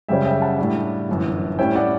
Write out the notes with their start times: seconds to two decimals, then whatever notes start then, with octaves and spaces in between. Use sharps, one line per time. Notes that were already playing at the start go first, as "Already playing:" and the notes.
0.09 F#2 C#3 G3 C#4 E5 G5
0.25 E5 G5
0.42 F#5 A5
0.58 A2 G3 D4
1.09 G1 F#2 E3
1.59 A2 G3 C#4 E4 E5 G5
1.75 D5 F#5